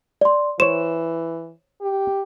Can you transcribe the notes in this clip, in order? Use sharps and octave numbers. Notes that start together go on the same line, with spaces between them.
D5 C6
E3 C5 C#5 E7
G4